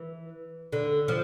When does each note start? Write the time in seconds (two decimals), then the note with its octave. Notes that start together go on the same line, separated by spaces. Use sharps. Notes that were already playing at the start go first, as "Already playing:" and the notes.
Already playing: E3
0.73 D3
1.08 F3